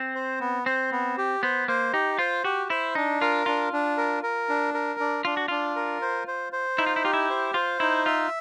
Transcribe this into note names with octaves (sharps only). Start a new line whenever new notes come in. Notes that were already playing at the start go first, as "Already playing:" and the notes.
Already playing: C4
C5
B3
C4 C5
B3
G4
B3 C5
A#3 C5
D#4 G4
F4 C5
F#4 G4
E4 C5
D4 D#4
F4 A#4
D4 F4
D4
A#4
A#4
D4
A#4
D4
D4 F4
F#4
D4 F4
A#4
C5
C5
C5
D#4 E4
F4
E4
F4 G4
E4
C5
F4 C5
D#4 E4
F4 E5